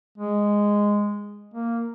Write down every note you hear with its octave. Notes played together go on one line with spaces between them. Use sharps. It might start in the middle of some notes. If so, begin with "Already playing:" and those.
G#3
A#3